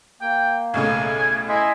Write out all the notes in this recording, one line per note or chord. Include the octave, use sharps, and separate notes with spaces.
A#3 G5
B1 A2 C#3 G#5
E4 D#5 G#5 C6